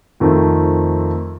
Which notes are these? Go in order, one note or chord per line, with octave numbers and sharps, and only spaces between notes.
F2 D#3 A3 C4